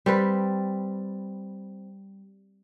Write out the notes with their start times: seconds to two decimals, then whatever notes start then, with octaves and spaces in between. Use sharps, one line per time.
0.06 G3 C4 B4